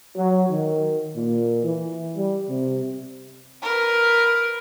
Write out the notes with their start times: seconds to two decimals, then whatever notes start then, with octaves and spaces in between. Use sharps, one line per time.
0.16 F#3
0.48 D#3
1.15 A#2
1.63 E3
2.16 G3
2.47 C3
3.63 A#4 B4